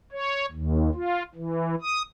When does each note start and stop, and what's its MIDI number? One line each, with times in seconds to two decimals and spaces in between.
0.12 0.46 73
0.52 0.90 39
0.95 1.23 65
1.35 1.75 52
1.82 2.03 87